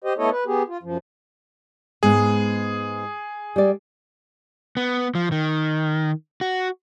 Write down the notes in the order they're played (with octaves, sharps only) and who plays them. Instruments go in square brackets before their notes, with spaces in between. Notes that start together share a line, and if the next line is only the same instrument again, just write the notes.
[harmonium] G4 C5 D#5
A3 B3 E4 A4 C#5 D#5
B4
B3 G4 G#4
F4
F#2 F3
[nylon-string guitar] G#2 G#3 B3 [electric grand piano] G#4
[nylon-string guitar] G3 D5
[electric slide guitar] B3
F3
D#3
F#4